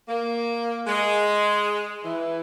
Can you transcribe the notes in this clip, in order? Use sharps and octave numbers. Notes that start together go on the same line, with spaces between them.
A#3
G#3
E3